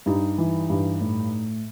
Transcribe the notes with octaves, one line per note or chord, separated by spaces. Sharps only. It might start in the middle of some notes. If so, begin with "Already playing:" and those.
G2 D#4
E3
G2
A2